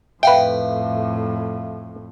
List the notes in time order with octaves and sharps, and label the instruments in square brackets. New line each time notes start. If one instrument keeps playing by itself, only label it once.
[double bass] F2 A2 [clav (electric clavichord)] B4 G5 [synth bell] E5 F5